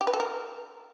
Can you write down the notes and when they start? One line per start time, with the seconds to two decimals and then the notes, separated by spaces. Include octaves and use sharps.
0.01 G4
0.07 B4
0.13 A4
0.20 A#4